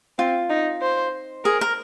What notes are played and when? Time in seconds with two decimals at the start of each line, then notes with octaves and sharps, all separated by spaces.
0.18 C4 F4
0.50 D#4
0.82 C5
1.45 G#4 A#4
1.61 A#4